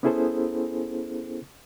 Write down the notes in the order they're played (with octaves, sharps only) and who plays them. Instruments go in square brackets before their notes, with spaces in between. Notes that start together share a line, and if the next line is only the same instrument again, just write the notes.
[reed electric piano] B3 C#4 E4 G#4 A4 C5